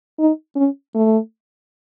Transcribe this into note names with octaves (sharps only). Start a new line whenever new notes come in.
D#4
C#4
A3